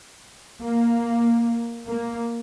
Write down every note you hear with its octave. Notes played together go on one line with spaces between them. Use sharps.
A#3
A#3